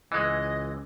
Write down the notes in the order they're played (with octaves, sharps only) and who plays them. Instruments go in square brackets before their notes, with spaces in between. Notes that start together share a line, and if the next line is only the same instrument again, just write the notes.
[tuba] C#2 [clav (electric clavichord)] E3 G#3 [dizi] D#5